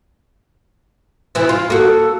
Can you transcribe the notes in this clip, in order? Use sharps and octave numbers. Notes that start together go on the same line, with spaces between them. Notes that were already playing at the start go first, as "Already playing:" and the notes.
B2 E3
F4
A#3 F#4 A4